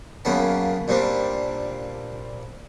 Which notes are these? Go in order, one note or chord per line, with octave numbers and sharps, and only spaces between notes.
F#2 C#3 A#3 B3 A5
A#2 G3 C4 D4